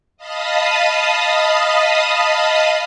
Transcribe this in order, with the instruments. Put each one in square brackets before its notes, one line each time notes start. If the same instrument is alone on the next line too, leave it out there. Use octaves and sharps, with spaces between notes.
[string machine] D#5 F5 A5 B5 D#6